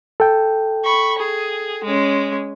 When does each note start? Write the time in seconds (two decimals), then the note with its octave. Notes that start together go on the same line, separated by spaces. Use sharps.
0.20 A4 G5
0.85 B5 C#6
1.18 G#4
1.84 G#3 C#4